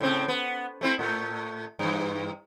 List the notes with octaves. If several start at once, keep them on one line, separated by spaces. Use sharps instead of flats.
A2 C#3 C4
B3
A3 C4 E4
A2 A3
G2 E3